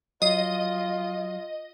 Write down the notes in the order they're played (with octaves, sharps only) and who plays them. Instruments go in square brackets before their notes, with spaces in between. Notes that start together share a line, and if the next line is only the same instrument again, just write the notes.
[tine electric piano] F#3 C7 [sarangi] F4 [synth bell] D#5